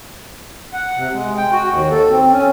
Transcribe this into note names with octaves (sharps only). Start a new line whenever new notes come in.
F#5
C3
G#3
G5
F#4
D#2
A4
C4
C#4